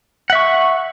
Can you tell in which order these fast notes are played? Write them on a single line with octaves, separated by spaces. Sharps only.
F#5 E5 C#6